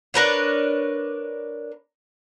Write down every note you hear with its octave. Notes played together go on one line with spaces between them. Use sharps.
D4 A#4 B4 C#5